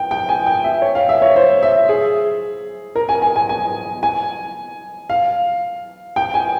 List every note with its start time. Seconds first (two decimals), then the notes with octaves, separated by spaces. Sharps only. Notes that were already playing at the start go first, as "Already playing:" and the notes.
Already playing: G5
0.11 G5
0.29 G#5
0.46 G5
0.64 E5
0.82 C#5
0.95 F5
1.09 E5
1.22 C#5
1.36 C5
1.63 E5
1.89 G#4
2.96 A#4
3.09 G#5
3.22 G#5
3.36 G#5
3.49 G#5
4.03 G#5
5.10 F5
6.16 G5
6.34 G#5